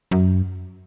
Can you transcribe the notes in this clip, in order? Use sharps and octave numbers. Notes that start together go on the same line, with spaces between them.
F#2